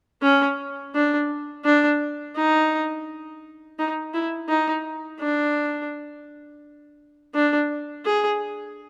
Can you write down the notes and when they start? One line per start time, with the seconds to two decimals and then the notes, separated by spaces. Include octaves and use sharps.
0.22 C#4
0.94 D4
1.65 D4
2.36 D#4
3.79 D#4
4.14 E4
4.49 D#4
5.20 D4
7.34 D4
8.05 G#4